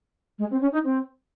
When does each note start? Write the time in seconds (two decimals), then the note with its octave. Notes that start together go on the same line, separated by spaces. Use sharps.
0.39 G#3
0.51 C4
0.61 C#4
0.72 D#4
0.84 C4